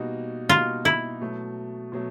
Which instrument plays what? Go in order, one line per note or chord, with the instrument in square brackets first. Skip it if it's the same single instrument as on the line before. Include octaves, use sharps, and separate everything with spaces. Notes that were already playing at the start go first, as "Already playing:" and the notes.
Already playing: [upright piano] B2 G3 A#3 D#4 F#4
[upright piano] B2 G3 A#3 D#4 F#4 [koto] F4
[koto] E4
[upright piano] B2 F#3 A3
B2 F#3 A3